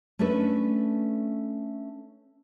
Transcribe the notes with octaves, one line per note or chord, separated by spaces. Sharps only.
A3 C#4 D4 A4 B4